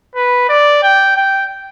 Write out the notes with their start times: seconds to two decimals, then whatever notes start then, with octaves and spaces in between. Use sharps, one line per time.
0.16 B4
0.49 D5
0.83 G5
1.16 G5